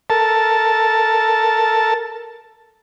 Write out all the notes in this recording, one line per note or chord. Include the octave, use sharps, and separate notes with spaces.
A4 A#4 A5